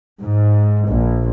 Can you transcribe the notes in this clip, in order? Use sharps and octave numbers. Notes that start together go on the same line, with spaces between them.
G#2
A#1